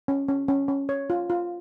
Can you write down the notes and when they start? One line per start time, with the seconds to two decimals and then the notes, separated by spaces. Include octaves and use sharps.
0.08 C#4
0.28 C#4
0.48 C#4
0.68 C#4
0.89 C#5
1.10 F4
1.30 F4